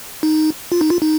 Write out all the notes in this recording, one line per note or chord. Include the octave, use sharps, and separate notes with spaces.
D#4
F4
D#4
F4
D#4